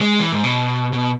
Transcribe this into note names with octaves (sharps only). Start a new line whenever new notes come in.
G#3
E3
G#2
B2
B2